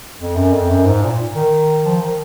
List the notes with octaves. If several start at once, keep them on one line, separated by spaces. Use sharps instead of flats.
F2
F#2
F2
F#2
G#2
A#2
D#3
F3
D#3